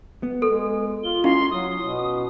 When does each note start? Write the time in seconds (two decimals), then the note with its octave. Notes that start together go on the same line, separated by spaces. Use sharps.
0.23 B3
0.42 G#3 A4
1.04 F4 G7
1.24 C#4 E4 F5 C6
1.51 F#3 D#6
1.80 B2